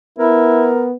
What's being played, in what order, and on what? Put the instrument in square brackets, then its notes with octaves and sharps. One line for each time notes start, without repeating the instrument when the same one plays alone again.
[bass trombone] B3 [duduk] E4 [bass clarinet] A#4